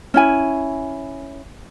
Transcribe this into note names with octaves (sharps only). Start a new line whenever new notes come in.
C#4 E4 G#5